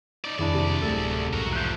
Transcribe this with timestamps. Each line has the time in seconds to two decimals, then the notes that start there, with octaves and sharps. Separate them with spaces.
0.25 D#4 D5
0.39 C2 F2 D#3 D4 E4 G#4 D5
0.54 C3
0.82 D1 A3 G#4 A4
1.33 B1 E2 G#2 F#4 A#4
1.53 F3 A3 F#6 G6